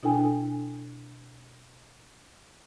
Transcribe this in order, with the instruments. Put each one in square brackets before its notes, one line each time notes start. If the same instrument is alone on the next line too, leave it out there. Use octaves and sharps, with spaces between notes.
[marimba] B2 D4 E4 A4 G5 G#5